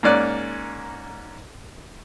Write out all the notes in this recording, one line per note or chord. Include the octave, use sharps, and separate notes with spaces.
G#2 A#3 C#4 D5 F#6